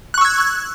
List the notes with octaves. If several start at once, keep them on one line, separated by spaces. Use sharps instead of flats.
C#6 E6 F#6 G#6